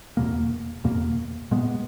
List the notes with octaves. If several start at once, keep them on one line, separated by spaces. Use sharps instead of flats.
E2 B2 A#3
E2 B2 A#3
A#2 G#3 B3